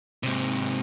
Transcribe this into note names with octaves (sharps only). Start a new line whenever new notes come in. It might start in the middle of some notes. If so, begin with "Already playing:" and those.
G#2 C3